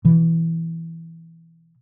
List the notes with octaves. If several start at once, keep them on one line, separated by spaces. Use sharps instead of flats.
B2 E3